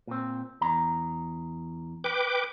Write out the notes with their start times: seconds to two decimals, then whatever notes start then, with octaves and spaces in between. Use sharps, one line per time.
0.07 A#2 C4
0.61 E2 A#5
2.04 B4 G5 D6